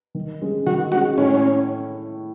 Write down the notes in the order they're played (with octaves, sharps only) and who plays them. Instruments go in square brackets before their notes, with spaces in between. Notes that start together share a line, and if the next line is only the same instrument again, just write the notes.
[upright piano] D#3
G#3 C#4
[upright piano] D#3 [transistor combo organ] F#4
[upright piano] G#3 C#4 [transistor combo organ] F#4
[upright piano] A2 [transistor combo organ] C#4